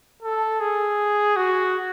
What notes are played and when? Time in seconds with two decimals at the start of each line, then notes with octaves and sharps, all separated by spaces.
0.22 A4
0.60 G#4
1.36 F#4